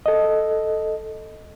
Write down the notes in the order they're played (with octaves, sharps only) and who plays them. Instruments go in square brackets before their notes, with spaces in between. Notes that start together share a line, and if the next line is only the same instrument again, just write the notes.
[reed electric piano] A4 D#5